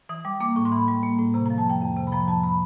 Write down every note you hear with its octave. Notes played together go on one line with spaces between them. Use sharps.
E3 D#6
G3 D6
A#3 D6
A2 C#6
C6
E3 B5
G3
A#3
A2
C3 A#5
F3 A#5
A5
F2 G5
F2
C3
B5
F3 A#5
F2 A5
B5